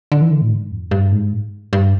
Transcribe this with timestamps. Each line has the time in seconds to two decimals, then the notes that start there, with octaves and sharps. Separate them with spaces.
0.12 D3
0.21 E3
0.31 D3
0.41 A2
0.52 G#2
0.71 F2
0.91 G2
1.12 G#2
1.73 G2